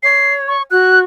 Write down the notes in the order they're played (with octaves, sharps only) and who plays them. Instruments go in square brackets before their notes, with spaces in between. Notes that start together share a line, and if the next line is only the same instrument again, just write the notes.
[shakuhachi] C#5 [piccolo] C7
[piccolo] C#6
[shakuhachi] F#4 [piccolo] F#6